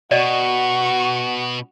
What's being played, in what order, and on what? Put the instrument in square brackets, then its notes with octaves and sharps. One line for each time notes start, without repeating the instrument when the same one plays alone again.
[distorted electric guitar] B2 [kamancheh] F#4 C#6 [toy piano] D5 D#5